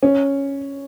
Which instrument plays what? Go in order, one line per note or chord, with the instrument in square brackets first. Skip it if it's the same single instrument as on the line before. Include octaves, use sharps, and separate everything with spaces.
[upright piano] C#4